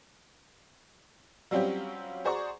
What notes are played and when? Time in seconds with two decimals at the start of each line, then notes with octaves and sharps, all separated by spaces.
1.51 F#3 G3 C4 C#4 F4 G4
2.25 F#4 G#4 C5 D5 A#5 C#6